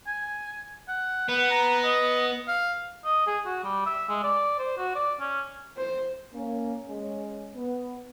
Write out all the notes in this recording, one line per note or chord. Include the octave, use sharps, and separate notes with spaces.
G#5
F#5
B3 F#5
A#5
D#5
F5
D#5
G#4
F#4
G3
E5
G#3
D5
C5
F#4
D5
C#4
C5
A#3 C#4
G#3 C#4
B3